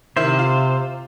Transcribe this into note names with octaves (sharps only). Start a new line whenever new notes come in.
C3 D#3 E4 C5
F4